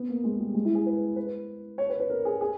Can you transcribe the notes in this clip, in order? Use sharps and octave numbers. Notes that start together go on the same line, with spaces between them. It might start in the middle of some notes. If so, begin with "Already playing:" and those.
Already playing: B3
A#3
G#3
G3
G#3
E4
G#4
B4
B4
C#5
B4
B4
A#4
G#4
G#4